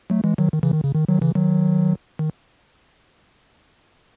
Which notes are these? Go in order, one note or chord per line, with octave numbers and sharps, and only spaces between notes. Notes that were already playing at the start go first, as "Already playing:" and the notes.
F#3 A3
E3 G#3
D#3 F#3
D#3
C#3 E3
D#3
C#3
D#3
D#3 F#3
C#3 E3
D#3 F#3
D#3